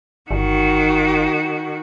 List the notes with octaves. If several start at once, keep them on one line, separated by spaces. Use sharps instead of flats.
G1 D#3 F#4